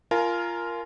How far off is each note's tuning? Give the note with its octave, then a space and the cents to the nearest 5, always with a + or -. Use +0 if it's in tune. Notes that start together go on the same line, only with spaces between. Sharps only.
F4 -15 A#4 +0 G#5 +30